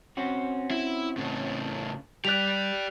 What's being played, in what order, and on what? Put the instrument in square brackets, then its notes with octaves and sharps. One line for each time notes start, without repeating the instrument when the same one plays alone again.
[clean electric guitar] C4 C#4 F#4
[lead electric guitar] E4
A2 C#3
[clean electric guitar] G3 [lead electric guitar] G4 D5 [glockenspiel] F#6 B6 F7